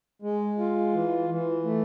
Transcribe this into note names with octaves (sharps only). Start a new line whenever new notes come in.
G#3
F4
E3
E3
A3